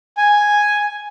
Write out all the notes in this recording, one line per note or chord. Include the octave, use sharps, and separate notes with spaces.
G#5